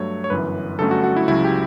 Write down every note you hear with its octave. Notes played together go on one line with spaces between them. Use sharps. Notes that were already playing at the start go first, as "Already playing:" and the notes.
Already playing: G2 F#3 A3 C#5
C#5
G1 F#2 E3 B4
G1 G2 F#3 A3 C#4 A4
F#4
F#4
E4
C#2 C#3 F#3 E4
G4